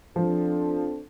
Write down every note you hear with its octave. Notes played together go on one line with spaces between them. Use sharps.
F3 C4 D4 A4